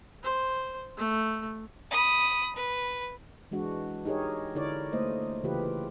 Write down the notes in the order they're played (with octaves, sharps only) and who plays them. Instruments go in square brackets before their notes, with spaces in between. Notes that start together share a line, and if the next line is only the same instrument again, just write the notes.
[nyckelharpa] C5
A3
[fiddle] B5 D#6
B4
[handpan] E3 G#3 D4 F#4
D#4 G4 G#4 A#4 C#5
D3 D#4 E4 A#4 C#5 D5
A3 A#3 C5 D#5
C#3 E3 F4 G4 B4